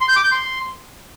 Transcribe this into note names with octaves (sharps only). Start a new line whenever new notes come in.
C6
G6
D6
G6
C6